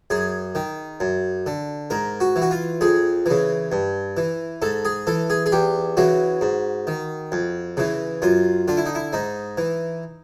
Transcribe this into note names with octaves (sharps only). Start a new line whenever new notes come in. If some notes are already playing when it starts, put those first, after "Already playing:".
F#2 G#4
D#3
F#2
D3
G#2 A#4
F#4
E3
F#4
F4
F2 G#4
C#3 E3
G2
E3
G#2 A4
G#4
E3 A4
G#4
G#4
E2 G4
C#3 E3 F#4
G#2
D#3
F2
C#3 E3
F#2 F4
D3 F4
E4
D#4
E4
G#2 D#4
E3